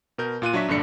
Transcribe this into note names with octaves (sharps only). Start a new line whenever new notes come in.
B2 A#4 G6
A#2 F4 F#6 D#7
F#3 D4 E5 C#6 B6
A#1 G2 D3 D4 C#7